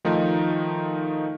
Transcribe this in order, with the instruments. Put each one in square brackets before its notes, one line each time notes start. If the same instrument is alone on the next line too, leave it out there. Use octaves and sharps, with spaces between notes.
[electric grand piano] D#3 F3 A3 D#4